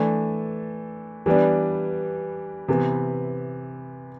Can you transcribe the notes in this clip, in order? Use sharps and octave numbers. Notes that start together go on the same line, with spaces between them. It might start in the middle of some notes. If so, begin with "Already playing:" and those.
Already playing: E3 A3 D4 A4
E3 G3 B3 D4
C3 E3 B3